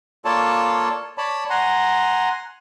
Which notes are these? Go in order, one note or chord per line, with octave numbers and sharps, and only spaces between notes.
A#3 F4 A4 C#5 D5 A5
C#5 D5 A5 B5
F#5 G#5 A#5 C6